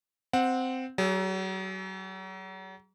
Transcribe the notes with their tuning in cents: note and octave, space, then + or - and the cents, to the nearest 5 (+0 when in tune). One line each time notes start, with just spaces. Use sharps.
C4 -10 F#5 -15
F#3 +40 G#4 +0